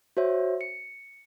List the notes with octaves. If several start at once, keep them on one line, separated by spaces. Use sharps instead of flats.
F#4 C5 C#5 E5
C#7